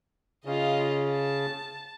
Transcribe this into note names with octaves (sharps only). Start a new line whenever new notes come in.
C#3 F4 D#5
A5